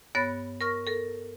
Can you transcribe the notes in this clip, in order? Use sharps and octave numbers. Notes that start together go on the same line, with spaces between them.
G2 B3 C#5 F#6 A6
A#4 C#6 F6 A#6
A4 A#4